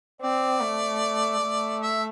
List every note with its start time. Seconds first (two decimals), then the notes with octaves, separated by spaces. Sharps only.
0.21 C4 D5
0.61 A3
1.42 A3
1.82 E5